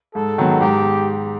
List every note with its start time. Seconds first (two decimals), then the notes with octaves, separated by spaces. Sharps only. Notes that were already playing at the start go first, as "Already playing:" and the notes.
0.15 G#2 A4
0.38 D#3 F#3 B3
0.61 G#2 G4